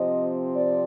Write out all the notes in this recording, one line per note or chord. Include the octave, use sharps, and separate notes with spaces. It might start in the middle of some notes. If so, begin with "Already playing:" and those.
Already playing: C3 F3 C4 D#5
D5